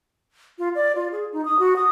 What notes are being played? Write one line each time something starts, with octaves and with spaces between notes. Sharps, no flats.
F4
D5
F4
G#4
D#4
D#6
F#4
D#6